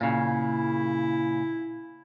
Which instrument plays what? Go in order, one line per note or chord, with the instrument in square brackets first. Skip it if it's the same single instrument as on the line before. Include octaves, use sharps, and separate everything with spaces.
[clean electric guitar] A#2 C#3 [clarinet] E4